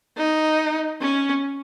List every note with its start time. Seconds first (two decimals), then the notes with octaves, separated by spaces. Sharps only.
0.17 D#4
1.01 C#4